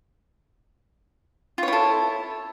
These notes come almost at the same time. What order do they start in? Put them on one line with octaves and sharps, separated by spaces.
F4 C#5 E4 A4